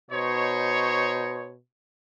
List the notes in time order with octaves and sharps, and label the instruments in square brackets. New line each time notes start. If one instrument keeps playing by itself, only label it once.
[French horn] B2 [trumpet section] D#4 C5 C#5